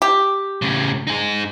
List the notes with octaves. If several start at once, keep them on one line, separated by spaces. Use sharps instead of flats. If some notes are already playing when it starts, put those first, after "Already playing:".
G4
A2 C#3
D#4 G#4